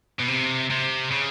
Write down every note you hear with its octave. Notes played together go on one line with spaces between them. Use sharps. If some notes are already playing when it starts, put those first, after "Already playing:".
B2
C3
C3
C#3